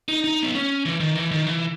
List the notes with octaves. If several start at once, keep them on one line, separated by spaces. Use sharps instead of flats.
D#4
D#4
B3
C#4
E3
D#3
E3
D#3
E3